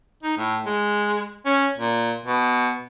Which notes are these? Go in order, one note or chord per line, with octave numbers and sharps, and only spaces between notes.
D#4
A2
G#3
C#4
A#2
B2